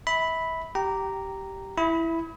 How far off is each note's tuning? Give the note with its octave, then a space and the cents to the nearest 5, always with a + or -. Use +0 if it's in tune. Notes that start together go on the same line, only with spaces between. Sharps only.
E5 -30 B5 +0
G4 -10 G5 -25 A#5 -5
E4 +0 B5 +0 D#6 +45